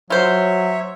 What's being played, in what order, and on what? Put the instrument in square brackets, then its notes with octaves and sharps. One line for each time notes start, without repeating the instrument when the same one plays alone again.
[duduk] F#3 [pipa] F4 C5 [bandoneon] C#5 E5